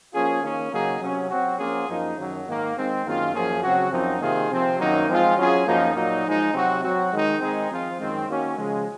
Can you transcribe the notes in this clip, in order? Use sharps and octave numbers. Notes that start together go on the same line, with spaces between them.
F3 A#3 C#4 F4 G#4
D#3 A#3 C#4
C#3 F#3 A#3 D#4 G#4
C3 F#3 C#4
F#3 C4 F#4
F3 A#3 C#4 F4 G#4
F#2 F3 A#3 D#4 G#4
F#2 D#3 F#3
G#2 D#3 A#3
D#3 G#3 C4 D#4
F#2 D#3 A#3 F4 G#4
F#2 F3 A#3 C#4 G#4
C#3 F#3 C4 F#4
F#2 F3 C4 D#4
C3 D#3 A#3 F4 G#4
C3 F3 C4
F#2 D#3 F#3 A#3 D#4
F3 G#3 C4 F4 G#4
F#3 C#4 F4 G#4
F#2 F3 A#3 D#4
A#2 F#3 A#3 D#4
F3 G#3 D#4
C3 F#3 C4 F#4
F#3 C4 F#4
D#3 G#3 D#4
D#3 G#3 C4 D#4 G#4
F3 C4 F4
F#2 D#3 G#3 C4
D#3 A#3 C#4 F#4
C#3 F3 G#3